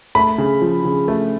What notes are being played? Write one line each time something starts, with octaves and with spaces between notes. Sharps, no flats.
A3 B5
C#3
F3
C#3
A3